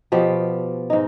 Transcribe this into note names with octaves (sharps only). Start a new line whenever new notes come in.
B2 F3 B3 G4
G#2 D#4